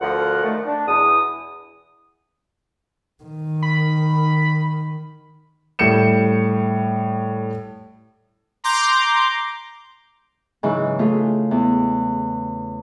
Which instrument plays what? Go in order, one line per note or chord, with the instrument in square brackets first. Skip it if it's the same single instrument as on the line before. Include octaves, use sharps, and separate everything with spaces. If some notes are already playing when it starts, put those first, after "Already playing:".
[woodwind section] D2 F3 A#4 F#5
D#3 F3 A3
D4
E2 B2 D#6
[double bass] D#3
[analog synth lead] B5
[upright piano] A2 G3 G6 C#7 E7
[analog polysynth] A#5 C6 D6 G6
[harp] G#2 C#3 E3 F#3
A3 F4 G#4
E2